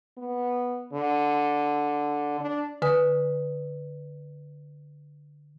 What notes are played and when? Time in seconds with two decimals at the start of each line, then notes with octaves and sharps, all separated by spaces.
0.18 B3
0.93 D3
2.40 D4
2.82 D3 B4 G#5 D#6